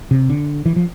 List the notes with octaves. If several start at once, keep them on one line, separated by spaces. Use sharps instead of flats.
C3
D3
E3
F3